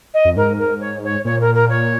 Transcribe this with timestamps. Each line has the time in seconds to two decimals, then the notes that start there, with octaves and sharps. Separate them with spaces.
0.14 D#5
0.25 F2
0.36 G#2 A#4
0.59 A#4
0.80 C#5
1.04 C#5
1.25 A#2 C#5
1.41 A#4
1.55 A#4
1.69 C#5